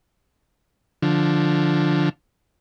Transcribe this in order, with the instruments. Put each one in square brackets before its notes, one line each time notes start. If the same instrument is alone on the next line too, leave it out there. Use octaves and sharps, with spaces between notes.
[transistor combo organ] D3 F3